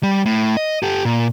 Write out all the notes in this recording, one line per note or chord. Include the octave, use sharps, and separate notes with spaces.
G3
A2
D#5
G4 A4
A#2